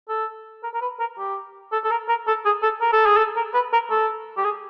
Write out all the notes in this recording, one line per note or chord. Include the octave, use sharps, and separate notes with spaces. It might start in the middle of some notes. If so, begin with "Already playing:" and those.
A4
A#4
A#4
B4
A#4
G4
A4
A4
A#4
A#4
A4
G#4
A4
A#4
A4
G#4
A4
A#4
B4
A#4
A4
G4
G#4